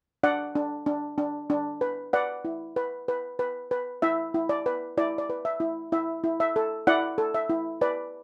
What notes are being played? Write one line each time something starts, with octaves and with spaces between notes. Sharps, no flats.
D4 D5 F#5
D4
D4
D4
D4
B4
B4 D5 F#5
E4
B4
B4
B4
B4
E4 E5
E4
D5
B4
E4 D5
D5
B4
E5
E4
E4 E5
E4
E5
A4
E4 D5 F#5
A4
E5
E4
B4 D5